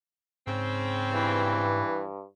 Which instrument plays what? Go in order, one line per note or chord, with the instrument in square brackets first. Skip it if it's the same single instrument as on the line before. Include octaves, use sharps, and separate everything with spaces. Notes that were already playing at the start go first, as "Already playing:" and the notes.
[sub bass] G#2 [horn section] C#3 C4
[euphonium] G2 [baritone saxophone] E3